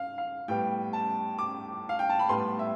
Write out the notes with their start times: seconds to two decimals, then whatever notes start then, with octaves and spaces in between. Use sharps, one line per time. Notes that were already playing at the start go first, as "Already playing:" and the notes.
Already playing: F5
0.18 F5
0.48 A2 G3 B3 G5
0.93 A5
1.38 D6
1.89 F5
1.99 G5
2.09 A5
2.19 B5
2.29 A2 G3 B3 C6
2.59 E5